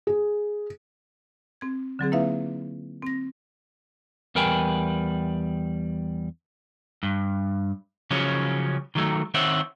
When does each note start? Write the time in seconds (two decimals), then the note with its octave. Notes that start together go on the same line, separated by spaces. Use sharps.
0.07 G#4
1.61 C4 G#6
1.99 D3 F#3 C4 G#4
2.12 A#3 D#4 E4 B4 E5 F5
3.02 C4 A#6
4.35 E2 G3 A#4 B4 G5 G#5
7.03 G2
8.11 C#3 F3 F#3 C#4
8.95 D#3 F#3 A3
9.34 D#3 C4 C5 C#5 E5 F#5